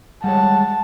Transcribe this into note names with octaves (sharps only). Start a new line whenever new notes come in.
G3 G#3 C#5 F#5 A5